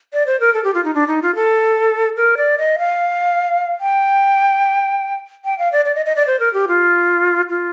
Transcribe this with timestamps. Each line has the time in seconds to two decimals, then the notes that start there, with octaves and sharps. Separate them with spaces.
0.13 D5
0.26 C5
0.40 A#4
0.54 A4
0.64 G4
0.74 F4
0.84 D#4
0.95 D4
1.08 D#4
1.22 F4
1.35 A4
2.17 A#4
2.37 D5
2.58 D#5
2.79 F5
3.81 G5
5.45 G5
5.59 F5
5.72 D5
5.85 D5
5.95 D#5
6.06 D#5
6.16 D5
6.27 C5
6.40 A#4
6.54 G4
6.68 F4
7.50 F4